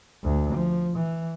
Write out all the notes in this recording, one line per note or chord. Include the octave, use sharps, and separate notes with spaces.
D2
F3
E3